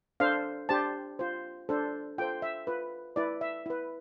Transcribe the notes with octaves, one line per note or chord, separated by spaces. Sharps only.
D4 A4 C5 F5
D4 G4 C5 A5
F4 C5
D4 A4 C5
F4 A4 C5 G5
E5
F4 B4
E4 B4 D5
E5
E4 B4